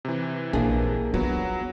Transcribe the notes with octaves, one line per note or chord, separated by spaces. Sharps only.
C3 E3
A#1 A#3 D4 G#4
F#3 B3 F4